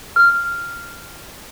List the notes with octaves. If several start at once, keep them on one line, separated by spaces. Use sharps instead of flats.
F6